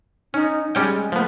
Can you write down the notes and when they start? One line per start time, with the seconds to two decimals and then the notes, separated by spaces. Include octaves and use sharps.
0.34 C#4 D#4
0.75 G3 G#3 C#4 G5
1.12 F3 A3 B3